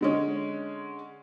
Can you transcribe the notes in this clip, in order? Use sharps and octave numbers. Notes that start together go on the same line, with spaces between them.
D3 G#3 C#4